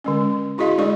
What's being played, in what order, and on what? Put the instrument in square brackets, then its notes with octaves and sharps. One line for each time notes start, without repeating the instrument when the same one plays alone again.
[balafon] D3 G#3 C#4
E4 F#4 G#4 D#5 F5 C6
G#3 D4 G#4 D5 C#6